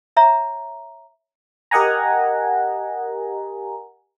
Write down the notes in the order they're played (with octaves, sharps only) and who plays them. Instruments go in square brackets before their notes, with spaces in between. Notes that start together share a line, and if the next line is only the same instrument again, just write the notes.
[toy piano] C#5 E5 A#5
[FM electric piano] G4 A#4 D#5 F#5 G#5 A#5